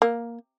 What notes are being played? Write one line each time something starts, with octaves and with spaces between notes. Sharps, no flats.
A#3